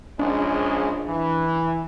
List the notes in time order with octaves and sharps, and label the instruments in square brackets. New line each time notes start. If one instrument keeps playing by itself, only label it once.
[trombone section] A#1 C#3 G#3 [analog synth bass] D4
[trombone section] E3